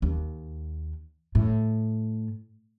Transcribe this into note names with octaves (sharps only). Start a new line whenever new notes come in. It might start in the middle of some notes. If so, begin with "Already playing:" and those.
D#2
A2